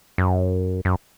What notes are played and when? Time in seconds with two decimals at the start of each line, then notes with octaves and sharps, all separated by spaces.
0.18 F#2
0.85 F#2